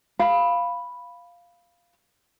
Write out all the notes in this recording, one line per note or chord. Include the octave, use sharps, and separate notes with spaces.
F5 B5